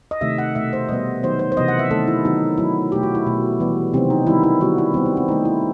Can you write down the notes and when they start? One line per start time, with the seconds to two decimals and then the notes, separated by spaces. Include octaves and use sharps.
0.11 D#5
0.21 C3 D#3 A3 E5
0.38 F#5
0.55 B2 A3 E5
0.73 C5
0.89 B2 G3 B3 D#5
1.23 D#3 F#3 B3 C5
1.39 C5
1.52 C5
1.57 C3 E3 B3 D#5
1.68 F#5
1.79 E5
1.90 D#3 A3 A4
2.08 E4
2.25 D#3 F#3 B3 D#4
2.58 D#3 F#3 A3 E4
2.92 B2 A3 G4
3.03 F#4
3.15 E4
3.26 B2 A3
3.60 E3 G3 B3
3.93 C3 D#3 F#3 B3 C4
4.10 D#4
4.27 D#3 G3 B3 E4
4.43 E4
4.60 D#3 G3 B3 F#4
4.78 E4
4.94 D#3 G3 B3 C4
5.05 B3
5.17 C4
5.28 D#3 D#4
5.31 A3
5.45 E4